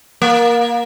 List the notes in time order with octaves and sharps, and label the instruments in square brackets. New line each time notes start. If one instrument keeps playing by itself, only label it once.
[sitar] A#3